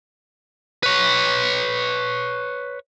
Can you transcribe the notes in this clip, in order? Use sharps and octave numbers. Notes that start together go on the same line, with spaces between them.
B4 C#5